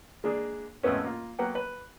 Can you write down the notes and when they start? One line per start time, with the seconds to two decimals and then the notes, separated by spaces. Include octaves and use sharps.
0.24 G#3 A#3 D4 G#4
0.83 G#1 F2 A2 A3 B3 C#4
1.04 A#3 F4
1.39 F#3 A#3 B3 F#5 G5
1.55 B4